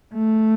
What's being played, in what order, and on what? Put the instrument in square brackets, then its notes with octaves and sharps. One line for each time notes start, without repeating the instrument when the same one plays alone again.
[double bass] A3